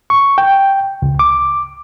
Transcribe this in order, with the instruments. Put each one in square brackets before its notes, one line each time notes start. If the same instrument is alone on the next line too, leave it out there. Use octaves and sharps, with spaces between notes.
[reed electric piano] C#6
G5
C#2
D6